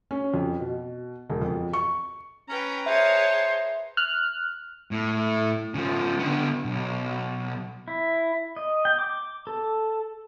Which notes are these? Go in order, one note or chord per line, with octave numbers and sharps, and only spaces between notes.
C#4
F2
B2
E1
F2
C#6
C#4 B4 G5 A#5 B5
G#4 C5 C#5 E5 A5
F6 F#6
A2
C#3 F3
D3 B3
B1
E4
D#5
G5
D6
A4